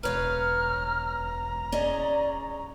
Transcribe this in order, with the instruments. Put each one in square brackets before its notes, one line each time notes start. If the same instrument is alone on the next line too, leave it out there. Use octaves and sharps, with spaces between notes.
[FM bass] E1 [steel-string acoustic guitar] B4 C#5 F5 [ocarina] A#5 [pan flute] F6
[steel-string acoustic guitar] C#4 G#4 D#5 [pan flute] D5